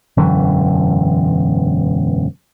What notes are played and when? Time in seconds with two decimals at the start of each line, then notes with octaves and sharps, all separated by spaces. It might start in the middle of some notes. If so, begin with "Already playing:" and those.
0.17 E1 F#2 D3 E3